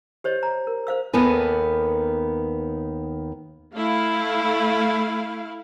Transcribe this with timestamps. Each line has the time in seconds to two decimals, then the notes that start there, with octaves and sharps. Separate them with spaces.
0.24 G4 C5 C#5 D#5
0.43 A#5
0.67 A#4
0.87 C5 F5 E6
1.13 D#2 D#3 B3 A4 B4 G#5
3.76 A3 E4 F5